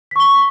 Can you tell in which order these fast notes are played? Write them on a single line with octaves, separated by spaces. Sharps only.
B6 C#6 G7